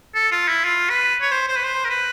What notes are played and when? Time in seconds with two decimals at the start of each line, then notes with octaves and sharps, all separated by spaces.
0.15 A4
0.31 F4
0.48 E4
0.65 F4
0.90 B4
1.21 C#5
1.31 C5
1.48 C5
1.56 B4
1.64 C5
1.85 A#4
1.90 B4